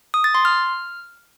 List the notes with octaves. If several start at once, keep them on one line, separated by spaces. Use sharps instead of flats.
D#6
A6
C6
F6